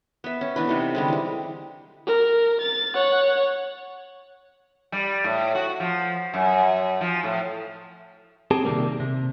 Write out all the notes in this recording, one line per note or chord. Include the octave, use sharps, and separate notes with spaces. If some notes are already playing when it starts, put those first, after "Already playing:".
B3 E5
C#4
E3 B3 D4 B4
C3 D#4 A4
D3 G3 G#3
E3 G3
A#4
A6
C#5 F#5
G3
A2
F#4
F3
F#2
F3
A2
C4 G4 G#4 A5
C3 D#3 E3 G3 G#3 A#3
C3